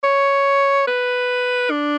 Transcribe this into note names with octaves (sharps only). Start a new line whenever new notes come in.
C#5
B4
D4